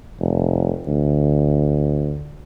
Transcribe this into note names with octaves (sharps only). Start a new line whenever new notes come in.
F1
D2